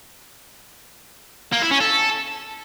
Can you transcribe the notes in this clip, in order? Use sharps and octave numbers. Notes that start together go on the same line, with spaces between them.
A#3
E4
C#4
A4